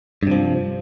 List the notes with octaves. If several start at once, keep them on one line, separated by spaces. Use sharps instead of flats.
G2 C3 F3